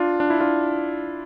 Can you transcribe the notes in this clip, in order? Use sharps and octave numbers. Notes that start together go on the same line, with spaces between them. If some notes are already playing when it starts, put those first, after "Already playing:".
Already playing: D4 F4
D4
E4
D4 F4